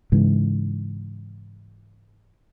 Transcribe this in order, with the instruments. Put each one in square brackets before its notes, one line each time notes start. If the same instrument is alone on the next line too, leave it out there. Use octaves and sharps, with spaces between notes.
[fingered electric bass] G#2 C#3 E3